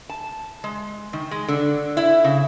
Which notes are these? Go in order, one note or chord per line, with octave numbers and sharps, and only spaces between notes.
A5
G#3
D#3
G#3
D3
E4
C#3